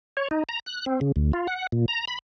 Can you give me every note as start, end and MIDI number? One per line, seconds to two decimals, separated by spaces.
0.17 0.28 73
0.31 0.44 63
0.49 0.60 82
0.66 0.85 90
0.86 1.00 60
1.01 1.12 49
1.16 1.32 38
1.33 1.47 65
1.48 1.67 78
1.72 1.86 46
1.88 2.05 82
2.08 2.19 83